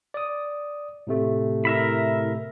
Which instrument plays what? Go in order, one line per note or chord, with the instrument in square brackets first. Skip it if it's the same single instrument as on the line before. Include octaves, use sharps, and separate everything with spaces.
[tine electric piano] D5 D#6
A2 C3 A3
[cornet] E4 [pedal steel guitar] A#4 E5 B5